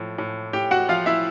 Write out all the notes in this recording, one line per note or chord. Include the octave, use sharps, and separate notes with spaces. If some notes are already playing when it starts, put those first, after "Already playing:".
Already playing: A2 F3
A2
A2 G4 G5
F#4 F#5
F3 F4 F5
E4 E5